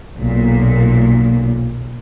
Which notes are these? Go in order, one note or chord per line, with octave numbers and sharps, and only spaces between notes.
B1 A#2